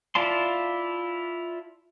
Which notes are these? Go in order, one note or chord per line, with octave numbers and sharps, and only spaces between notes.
E4 F4 D5 A5 C6